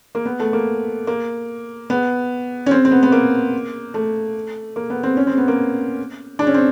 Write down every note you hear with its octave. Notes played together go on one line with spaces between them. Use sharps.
A#3
B3
A3
A#3
A#3
B3
C#4
C4
C4
B3
B3
A#3
A3
A#3
B3
C4
C#4
C4
B3
A#3
D4
C#4
C4